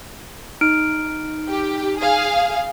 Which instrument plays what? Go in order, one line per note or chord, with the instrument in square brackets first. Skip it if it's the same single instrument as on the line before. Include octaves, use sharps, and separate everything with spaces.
[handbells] D#4 F6 D7
[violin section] G4
G#4 F5